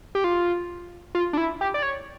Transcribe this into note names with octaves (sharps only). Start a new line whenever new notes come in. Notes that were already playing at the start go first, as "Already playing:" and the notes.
G4
F4
F4
D4
E4
G4
D5
C#5